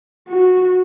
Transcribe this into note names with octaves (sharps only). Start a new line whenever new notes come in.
F#4